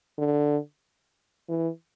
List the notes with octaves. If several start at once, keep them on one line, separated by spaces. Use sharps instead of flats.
D3
E3